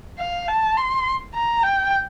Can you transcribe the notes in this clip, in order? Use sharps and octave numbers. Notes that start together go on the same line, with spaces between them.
F5
A5
C6
A#5
G5